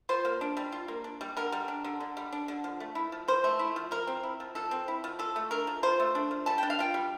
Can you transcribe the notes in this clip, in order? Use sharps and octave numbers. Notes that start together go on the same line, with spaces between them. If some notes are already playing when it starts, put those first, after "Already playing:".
F4 C5
A#3
D4
G3
F4
A#3
D4
G3
D3 A#4
G3
D4
D3
D3
G3
D4
D3
F3
A3
E4
F3
F3 C5
A3
E4
F3
F3 A#4
C4
E4
F3
F3 A4
C4
E4
F3
F4 A4
A3
D4 A#4
F3
F4 C5
A3
D4
F3
G3 A5
D4 G5
F5
F4 G5
G3